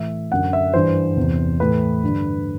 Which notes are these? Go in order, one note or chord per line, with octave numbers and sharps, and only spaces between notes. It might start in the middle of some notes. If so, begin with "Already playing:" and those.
Already playing: A2 E3 E5
F#2 D3 F#5
E5
G2 E3 C5
E2 C3 E3
A2 E3 B4
G2 D3